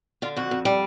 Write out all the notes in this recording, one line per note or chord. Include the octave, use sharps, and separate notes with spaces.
D3 F4
F2 F#4
F2
G3